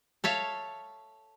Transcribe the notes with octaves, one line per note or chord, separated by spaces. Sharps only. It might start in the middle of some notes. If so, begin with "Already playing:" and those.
A4 C#5 E5 F5